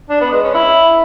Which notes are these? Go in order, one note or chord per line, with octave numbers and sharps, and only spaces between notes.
D4
B3
G#3
C#4
E4